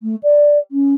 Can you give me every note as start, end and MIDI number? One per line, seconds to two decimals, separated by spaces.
0.01 0.15 57
0.23 0.58 74
0.71 0.94 61